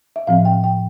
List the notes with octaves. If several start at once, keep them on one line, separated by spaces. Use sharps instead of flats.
E5
A2 F3 C4 F5
G5
G5